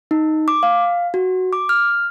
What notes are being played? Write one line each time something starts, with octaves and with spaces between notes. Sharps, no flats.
D#4
D6
F5
F#4
D6
F6